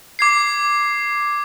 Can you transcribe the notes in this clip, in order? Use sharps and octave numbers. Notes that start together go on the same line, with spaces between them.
D6 G#6 C7